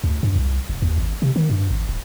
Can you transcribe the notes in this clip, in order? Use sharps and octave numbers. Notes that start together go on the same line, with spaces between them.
D2
G2
C2
F1
D#2
G#1
C3
D#3
G2
G#1
D#1